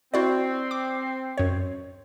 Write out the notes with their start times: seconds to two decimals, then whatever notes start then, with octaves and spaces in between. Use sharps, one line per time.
0.14 C4 E4 F#4 D5
0.71 D6
1.37 F#2 C#5